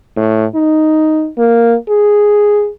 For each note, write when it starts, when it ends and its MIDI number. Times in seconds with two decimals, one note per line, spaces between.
0.17 0.45 45
0.55 1.28 63
1.38 1.75 58
1.89 2.69 68